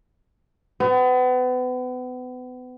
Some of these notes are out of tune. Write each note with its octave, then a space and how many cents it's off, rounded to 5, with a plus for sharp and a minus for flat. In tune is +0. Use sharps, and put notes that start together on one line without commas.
B3 +35